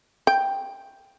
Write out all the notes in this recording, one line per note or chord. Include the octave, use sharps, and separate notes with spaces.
G5